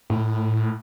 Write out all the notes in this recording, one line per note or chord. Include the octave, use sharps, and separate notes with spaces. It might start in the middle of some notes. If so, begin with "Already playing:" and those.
A2